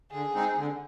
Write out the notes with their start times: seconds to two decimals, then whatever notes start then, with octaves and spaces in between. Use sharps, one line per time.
0.11 D3 G#4
0.34 G#3 C4 D#4
0.57 D3